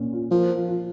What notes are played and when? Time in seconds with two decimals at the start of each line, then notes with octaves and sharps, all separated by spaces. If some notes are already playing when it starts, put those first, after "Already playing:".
Already playing: A#2 C#4 F4
0.13 F4
0.31 F3 A#3
0.50 F4
0.68 F4